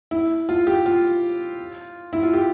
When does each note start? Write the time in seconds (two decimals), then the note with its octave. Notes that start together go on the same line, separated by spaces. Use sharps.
0.11 E4
0.49 F4
0.67 G4
0.86 F4
2.13 E4
2.23 F4
2.33 G4